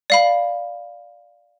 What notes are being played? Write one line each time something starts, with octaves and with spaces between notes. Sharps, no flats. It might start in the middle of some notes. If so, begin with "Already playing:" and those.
D5 F5 B5